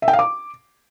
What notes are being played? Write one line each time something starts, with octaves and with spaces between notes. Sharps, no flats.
E5
G5
F5
D6